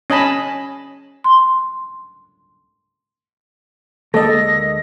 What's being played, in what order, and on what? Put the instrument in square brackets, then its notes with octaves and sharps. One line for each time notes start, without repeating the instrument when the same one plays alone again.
[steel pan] C#4 D#5 G#5 A5 B5
[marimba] C6
[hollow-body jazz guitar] D2 G#3 D5 [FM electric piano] A#3 D#5 [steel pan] A4 [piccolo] A#6